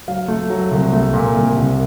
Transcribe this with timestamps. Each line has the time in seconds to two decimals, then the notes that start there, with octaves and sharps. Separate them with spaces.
0.08 F#3 F5
0.28 A3
0.50 F#3
0.71 C2
0.93 A3
1.14 A#2
1.35 C2
1.56 C2